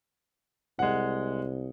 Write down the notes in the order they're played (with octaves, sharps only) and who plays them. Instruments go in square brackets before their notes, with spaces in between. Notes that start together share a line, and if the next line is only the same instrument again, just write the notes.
[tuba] C2 [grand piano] G#3 F#5